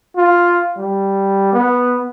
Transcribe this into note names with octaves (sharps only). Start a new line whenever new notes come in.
F4
G3
B3